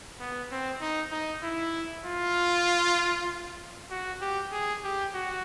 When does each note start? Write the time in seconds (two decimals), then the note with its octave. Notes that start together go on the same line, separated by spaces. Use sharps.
0.20 B3
0.51 C4
0.81 D#4
1.12 D#4
1.43 E4
2.05 F4
3.91 F#4
4.21 G4
4.52 G#4
4.83 G4
5.14 F#4